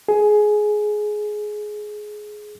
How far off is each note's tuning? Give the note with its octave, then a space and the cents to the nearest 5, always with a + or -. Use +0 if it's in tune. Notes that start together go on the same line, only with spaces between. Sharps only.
G#4 +15